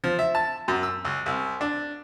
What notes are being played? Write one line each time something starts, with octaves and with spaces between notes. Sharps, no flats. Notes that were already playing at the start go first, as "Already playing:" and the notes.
F3
E5
A5
F#2
E6
C#2
C2
D4